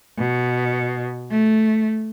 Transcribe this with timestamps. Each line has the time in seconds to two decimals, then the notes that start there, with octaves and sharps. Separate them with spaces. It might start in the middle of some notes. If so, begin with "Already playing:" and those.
0.18 B2
1.31 A3